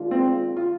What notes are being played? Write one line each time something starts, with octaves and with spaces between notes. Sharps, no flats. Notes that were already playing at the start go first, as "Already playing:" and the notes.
Already playing: D#3 G#3 D4 F4
C4
F4